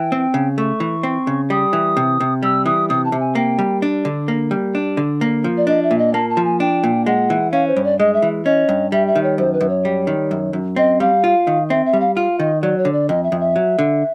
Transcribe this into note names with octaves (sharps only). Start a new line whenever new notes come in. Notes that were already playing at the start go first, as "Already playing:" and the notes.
Already playing: E3 G5
C4
C#3
A3 C#6
E3
C4
C#3
G3 D#6
E3
C3
C3
G3 E6
E3 D#6
C3 D#6
A5
C3
G#5
A#3 G5
G3
D4
D3
A#3
G3
D4
D3
A#3
F3
D5
D4 D#5
E5
A#2
D#5
A#3 A5
A5
F3
G#5
D4 G5
A#2
G#3 F#5
E3
C#4 F5
C5
G2
D5
G#3 D#5
E5
E3
C#4 D#5
G2
G3 E5
E5
D#3
C#5
F#2 C5
B4
F#2
C#5
G3
D#3
F#2
F#2
C4 D#5
G3 F5
F4
D#3
C4 E5
E5
G3
F5
F4 F5
D#3 D#5
F#3 D5
C#5
D3
D5
F2 D#5
E5
F2
E5
F#3
D3